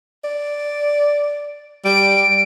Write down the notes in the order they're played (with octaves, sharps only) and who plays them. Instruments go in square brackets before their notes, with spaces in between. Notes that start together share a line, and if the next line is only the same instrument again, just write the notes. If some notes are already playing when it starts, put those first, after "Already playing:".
[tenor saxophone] D5
[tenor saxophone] G3 [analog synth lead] D7